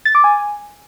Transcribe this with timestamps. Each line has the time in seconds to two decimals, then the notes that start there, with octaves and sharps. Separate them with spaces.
0.05 A6
0.15 D6
0.24 G#5